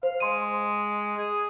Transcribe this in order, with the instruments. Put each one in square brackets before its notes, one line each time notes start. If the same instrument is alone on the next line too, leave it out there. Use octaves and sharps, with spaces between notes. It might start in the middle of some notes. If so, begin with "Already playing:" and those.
[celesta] C5 [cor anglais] F5
[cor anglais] G#3 [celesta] C6 D#7
[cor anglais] G#4